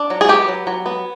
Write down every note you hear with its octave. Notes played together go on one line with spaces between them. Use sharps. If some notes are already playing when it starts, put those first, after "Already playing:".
Already playing: D4
F#3
G#4
B3 G4
F#3
F#3
B3